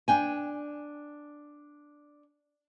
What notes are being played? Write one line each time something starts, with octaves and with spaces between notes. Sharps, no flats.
D4 G5 G#5